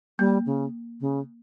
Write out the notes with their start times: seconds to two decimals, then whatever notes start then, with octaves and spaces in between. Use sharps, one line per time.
0.19 G3 A#3
0.46 C#3
1.01 C#3